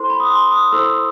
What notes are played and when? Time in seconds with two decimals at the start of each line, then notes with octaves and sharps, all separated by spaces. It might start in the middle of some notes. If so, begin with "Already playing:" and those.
Already playing: E4 A4 C5 C6
0.10 B5
0.20 D#6
0.30 C6
0.51 D#6
0.72 E4 A4 C5 E6